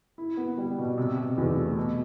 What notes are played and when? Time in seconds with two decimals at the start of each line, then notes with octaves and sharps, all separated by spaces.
0.18 E4
0.37 B3
0.58 G3
0.78 B2
0.98 C3
1.17 C3
1.37 E2
1.56 A3
1.77 B2